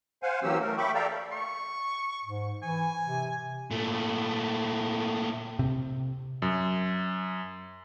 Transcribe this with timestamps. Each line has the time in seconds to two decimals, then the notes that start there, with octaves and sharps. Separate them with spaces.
0.23 C5 F5 F#5 G#5
0.43 E3 F#3 A#3 C#4 G4 E6
0.60 A3 A#4
0.78 E5 G5 B5 C#6 D6
0.94 A4 D5 E5 F5 G5 A#5
1.32 C#6
2.24 G#2
2.63 E3 G#5
3.06 C3
3.71 A#2 A3
5.59 C3
6.42 F#2